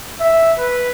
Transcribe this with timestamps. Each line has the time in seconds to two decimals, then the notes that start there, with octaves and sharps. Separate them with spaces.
0.20 E5
0.58 B4